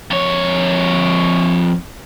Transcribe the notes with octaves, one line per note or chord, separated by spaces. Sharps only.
F2 C#5